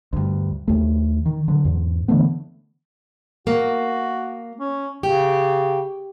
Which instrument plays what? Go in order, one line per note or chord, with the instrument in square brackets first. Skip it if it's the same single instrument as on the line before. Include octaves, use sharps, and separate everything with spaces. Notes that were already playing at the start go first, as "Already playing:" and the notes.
[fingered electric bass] D2 G2
D#2 A3
D#3
D3 F#3
E2 G#2
D3 E3 A3 B3
[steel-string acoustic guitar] A#3 [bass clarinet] F#4
[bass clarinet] C#4
[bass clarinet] C#3 [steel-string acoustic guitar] G4